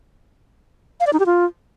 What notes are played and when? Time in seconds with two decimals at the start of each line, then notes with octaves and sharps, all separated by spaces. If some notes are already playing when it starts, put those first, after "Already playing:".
1.00 F5
1.07 D5
1.13 D#4
1.20 G4
1.26 F4